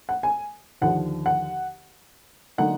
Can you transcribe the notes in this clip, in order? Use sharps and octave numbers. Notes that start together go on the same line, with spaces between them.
F#5
G#5
D#2 D3 F3 F#5
F#5
D3 F#3 A#3 D#4 F#5